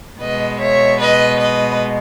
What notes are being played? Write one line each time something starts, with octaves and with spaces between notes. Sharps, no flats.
B2 G#3 B4 D#5
C#5 E5
B4 D#5
B4 D#5